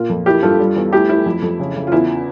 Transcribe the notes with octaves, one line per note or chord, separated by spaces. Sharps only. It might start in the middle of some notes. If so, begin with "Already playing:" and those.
Already playing: A#2 A#3 F4
F2
A#3 E4 G4
G2 F4 A4
G3
E2
A3 E4 G4
A3 E4
F2
F2
C#3
C#3
F4
E2 E4